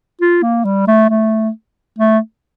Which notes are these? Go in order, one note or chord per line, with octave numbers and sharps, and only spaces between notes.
F4
A#3
G3
A3
A3
A3